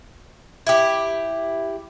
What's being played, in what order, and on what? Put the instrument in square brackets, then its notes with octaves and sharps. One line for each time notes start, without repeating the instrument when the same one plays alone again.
[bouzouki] E4 G4